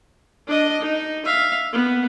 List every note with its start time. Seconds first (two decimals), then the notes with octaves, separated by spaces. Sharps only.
0.47 D4 D#5
0.81 D#4
1.25 E5 F5
1.73 B3